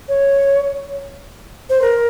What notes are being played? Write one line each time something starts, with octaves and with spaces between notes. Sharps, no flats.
C#5
C5
A#4